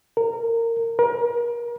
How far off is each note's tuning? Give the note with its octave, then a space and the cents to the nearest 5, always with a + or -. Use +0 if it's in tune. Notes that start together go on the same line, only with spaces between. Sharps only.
A#4 -20
A#4 +35